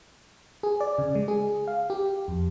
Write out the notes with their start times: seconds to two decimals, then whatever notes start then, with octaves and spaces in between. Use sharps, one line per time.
0.63 G#4
0.80 D5
0.98 C#3
1.15 G#3
1.28 G#4
1.67 F5
1.90 G4
2.28 F2